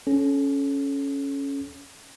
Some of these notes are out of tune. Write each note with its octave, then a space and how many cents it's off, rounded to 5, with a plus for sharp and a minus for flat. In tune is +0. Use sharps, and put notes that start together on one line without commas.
C#4 +0 A4 -30